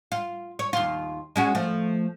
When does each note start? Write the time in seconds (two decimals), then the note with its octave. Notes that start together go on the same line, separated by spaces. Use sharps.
0.12 F4
0.59 C#5
0.73 D#2 F4
1.36 G#3 C#4 F#4
1.55 F3 A3